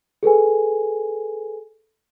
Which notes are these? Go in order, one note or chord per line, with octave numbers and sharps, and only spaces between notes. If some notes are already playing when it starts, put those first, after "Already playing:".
G#4 A4 B4 G#5